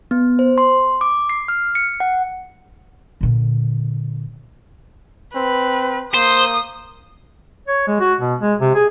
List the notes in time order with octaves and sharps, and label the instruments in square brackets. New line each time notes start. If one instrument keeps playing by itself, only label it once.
[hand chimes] B3
C5
C6
D6
C7
F6
C#7
F#5
[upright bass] A#2 D3
[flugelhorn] C4 [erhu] B4
[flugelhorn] A#3 [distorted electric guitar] C5 [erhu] D#6
[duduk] C#5
G#3
F#4
B2
G#3
C3
G#4